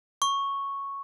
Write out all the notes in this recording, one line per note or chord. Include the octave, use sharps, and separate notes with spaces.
C#6